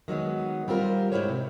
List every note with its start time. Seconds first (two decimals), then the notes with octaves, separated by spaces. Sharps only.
0.08 D#3 F#3 G#3 B3
0.68 G3 C4 F4 A#4
1.12 G#2 G3 E4 A#4 C5 C#5
1.28 C3